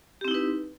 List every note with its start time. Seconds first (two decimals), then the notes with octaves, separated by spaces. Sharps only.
0.21 G4
0.25 C4
0.28 E4
0.31 D#4
0.34 B4